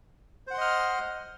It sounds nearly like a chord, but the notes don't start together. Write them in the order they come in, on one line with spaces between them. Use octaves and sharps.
C5 F#5 C6 D#5 F6